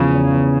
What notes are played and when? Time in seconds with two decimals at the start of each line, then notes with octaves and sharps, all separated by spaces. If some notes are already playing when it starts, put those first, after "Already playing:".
Already playing: E2 C#3 F3
0.13 E2
0.32 E2